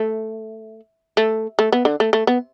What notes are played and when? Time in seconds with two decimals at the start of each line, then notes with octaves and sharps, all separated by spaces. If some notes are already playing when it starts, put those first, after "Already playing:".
Already playing: A3
1.17 A3
1.59 A3
1.72 B3
1.85 D3
2.00 A3
2.13 A3
2.27 B3